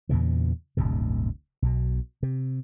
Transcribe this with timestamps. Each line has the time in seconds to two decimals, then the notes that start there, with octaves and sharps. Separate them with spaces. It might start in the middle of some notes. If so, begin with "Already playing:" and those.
0.09 E2 A#2 C#3 E3
0.77 D1 G1 D2 C3
1.62 B1 B2
2.23 C3